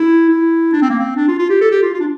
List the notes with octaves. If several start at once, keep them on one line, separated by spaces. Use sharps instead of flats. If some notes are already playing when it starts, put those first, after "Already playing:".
Already playing: E4
E4
D4
C4
A#3
C4
D4
F4
F4
G4
A4
G4
F4
F4
D4